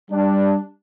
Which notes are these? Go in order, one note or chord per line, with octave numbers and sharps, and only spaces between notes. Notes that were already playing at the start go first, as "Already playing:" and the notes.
G3 D4